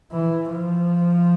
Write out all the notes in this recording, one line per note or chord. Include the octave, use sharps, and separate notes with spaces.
E3
F3